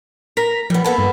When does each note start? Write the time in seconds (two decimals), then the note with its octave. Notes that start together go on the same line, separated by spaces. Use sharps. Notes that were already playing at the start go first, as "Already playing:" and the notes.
0.37 A#4 A#6 B6
0.70 F3 G3 B3
0.84 A#3 B3 A4 F#5 A5
0.98 G2